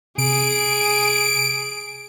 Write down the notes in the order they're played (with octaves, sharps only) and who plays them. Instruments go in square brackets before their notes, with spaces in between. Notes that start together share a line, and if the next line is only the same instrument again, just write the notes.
[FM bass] C3 [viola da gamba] G#4 [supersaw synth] D7